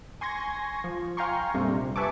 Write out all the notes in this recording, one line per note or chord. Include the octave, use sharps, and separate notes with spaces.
G#5 C6 C#6 G#6 A#6
F3
F5 G5 G#5 A#5 C6 C#6
A#1 F2 C3 G3
B4 E5 G#5 A5 C#6 D6